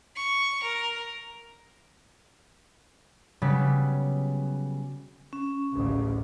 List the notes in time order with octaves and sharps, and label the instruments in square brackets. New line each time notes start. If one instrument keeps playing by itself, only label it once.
[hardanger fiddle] C#6
A#4
[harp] C#3 F#3 G3 B3
[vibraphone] C#4
[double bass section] A1 D2 C#3